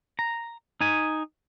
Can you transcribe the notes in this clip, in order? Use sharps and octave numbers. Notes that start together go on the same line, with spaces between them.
A#5
D#4 G#5